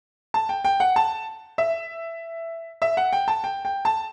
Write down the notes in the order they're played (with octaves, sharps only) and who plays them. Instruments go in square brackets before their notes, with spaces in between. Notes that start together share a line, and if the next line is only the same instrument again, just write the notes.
[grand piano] A5
G5
G5
F#5
A5
E5
E5
F#5
G5
A5
G5
G5
A5